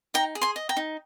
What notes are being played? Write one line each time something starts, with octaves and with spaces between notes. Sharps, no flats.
D#4 G5 A#5
G#4
G#5 C6
D#5
G5 A#5
D#4